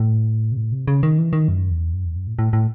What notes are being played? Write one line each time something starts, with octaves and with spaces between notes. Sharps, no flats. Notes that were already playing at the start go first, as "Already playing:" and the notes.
Already playing: A2
C3
A2
C3
C#3
D#3
E3
D#3
F#2
E2
F#2
E2
F#2
A2
A2
A2